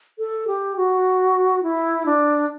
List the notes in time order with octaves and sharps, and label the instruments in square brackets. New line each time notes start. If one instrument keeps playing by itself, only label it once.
[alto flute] A4
G4
F#4
E4
D4